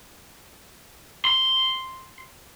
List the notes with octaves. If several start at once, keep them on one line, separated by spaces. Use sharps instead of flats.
C6